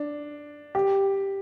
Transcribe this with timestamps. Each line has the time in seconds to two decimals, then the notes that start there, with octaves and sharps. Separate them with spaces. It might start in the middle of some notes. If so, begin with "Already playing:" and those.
Already playing: D4
0.75 G4